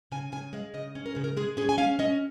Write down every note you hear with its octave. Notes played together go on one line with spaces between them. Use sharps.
C#3 G#5
C#3 G#5
G#3 F5
C#3 D#5
C#4
A#4
C#3 G#4
A#4
G#3 G#4
C#4 G#4
G#5
C#4 F5
C#4 D#5